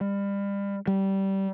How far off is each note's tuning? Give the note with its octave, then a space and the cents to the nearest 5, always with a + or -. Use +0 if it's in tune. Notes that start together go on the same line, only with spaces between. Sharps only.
G3 +30
G3 -20